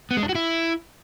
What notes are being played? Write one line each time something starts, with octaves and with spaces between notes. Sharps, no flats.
B3
G#3
D4
F#4
E4